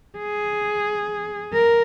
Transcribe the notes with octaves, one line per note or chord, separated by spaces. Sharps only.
G#4
A#4